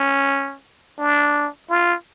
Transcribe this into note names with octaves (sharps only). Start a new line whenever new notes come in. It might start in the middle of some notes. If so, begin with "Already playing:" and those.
Already playing: C#4
D4
F4